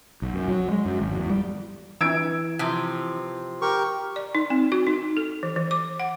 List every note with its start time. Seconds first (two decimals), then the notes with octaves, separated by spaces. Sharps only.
0.22 B1
0.34 F#2
0.48 F#3
0.71 G#3
0.85 F#2
1.00 G#1
1.15 E2
1.30 G3
2.01 E3 E6 G#6 D7
2.59 C3 F3
3.62 G4 A#4 C#6
4.16 D5
4.35 D#4
4.50 C4
4.72 F#4
4.87 D#4
5.17 A4
5.43 E3
5.56 E3
5.71 D6
6.00 F#5